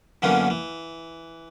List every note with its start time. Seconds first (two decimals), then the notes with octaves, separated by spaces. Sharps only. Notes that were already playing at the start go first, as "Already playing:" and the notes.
0.22 F#2 D3 E3 A#3 B3 C#4
0.50 E3